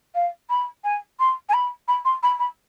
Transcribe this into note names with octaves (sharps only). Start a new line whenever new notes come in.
F5
B5
G#5
C6
G#5
B5
B5
C6
B5
B5